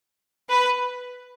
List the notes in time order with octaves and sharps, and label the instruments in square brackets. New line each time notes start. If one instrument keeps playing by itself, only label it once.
[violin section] B4